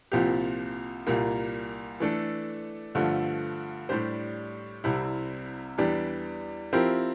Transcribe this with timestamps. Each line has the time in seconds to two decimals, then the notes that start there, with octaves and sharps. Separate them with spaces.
0.12 C2 A#2 F3 C4 G4
1.07 C2 A#2 G3 A#3
2.00 E3 A3 D4 A4
2.95 G2 D3 F3 A3
3.89 A2 G3 D4 G4 C5
4.84 C2 C3 G3 C4 E4
5.78 E2 E3 G3 D4 G4
6.73 F3 C4 E4 G4 A#4